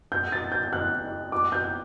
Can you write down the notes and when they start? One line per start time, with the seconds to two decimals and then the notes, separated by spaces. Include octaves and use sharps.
0.12 G6
0.32 A6
0.52 G6
0.73 F#6
1.32 D6
1.52 G6